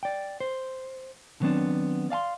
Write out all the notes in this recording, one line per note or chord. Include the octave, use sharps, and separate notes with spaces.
D5 G5
C5
D3 D#3 F#3 B3 C4 D4
D5 F5 G#5 C6